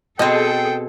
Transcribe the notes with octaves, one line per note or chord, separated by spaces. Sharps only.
B2 C4 G#4 A4 D#5 G5